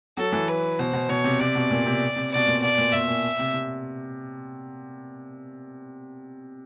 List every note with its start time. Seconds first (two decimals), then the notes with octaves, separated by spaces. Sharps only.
0.17 F#3 A4
0.32 E3
0.49 B4
0.79 B2 C5
0.93 B2
1.09 B2 C#5
1.24 C3
1.39 C3 D5
1.55 B2
1.70 A#2
1.86 C3
2.16 C3
2.32 B2 D5
2.47 A#2
2.62 B2 D5
2.78 A#2
2.92 A#2 E5
3.08 A#2
3.39 C3
3.54 C3